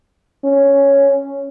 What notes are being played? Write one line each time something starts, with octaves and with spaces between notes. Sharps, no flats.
C#4